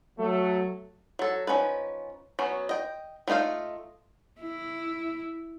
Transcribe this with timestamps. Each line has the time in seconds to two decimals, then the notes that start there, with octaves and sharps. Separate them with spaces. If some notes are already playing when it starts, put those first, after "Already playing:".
0.18 F#3 A3
1.19 F#3 A4
1.47 F3 C#4 D#4 B4
2.39 F#3 B3 C#4 C#5
2.69 D#5 G5
3.28 F#3 A3 D#4 F4 F5
4.41 E4